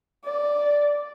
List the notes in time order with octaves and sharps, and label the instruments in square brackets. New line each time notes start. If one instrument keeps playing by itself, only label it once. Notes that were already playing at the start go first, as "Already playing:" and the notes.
[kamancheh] D5